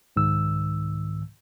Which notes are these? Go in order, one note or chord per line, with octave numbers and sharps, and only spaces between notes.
C2 G#2 D#3 E6